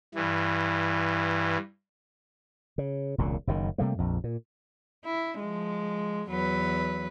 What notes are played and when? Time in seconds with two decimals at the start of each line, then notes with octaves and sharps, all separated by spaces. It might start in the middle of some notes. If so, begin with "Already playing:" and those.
0.15 G2 E3
2.78 C#3
3.18 E1 C#2 A#2
3.47 F#1 F#2 B2 D#3
3.78 C3 G3 A3 A#3
3.99 A#1 F2
4.24 A#2
5.05 E4
5.39 F3 G#3
6.30 E2 F#3 B4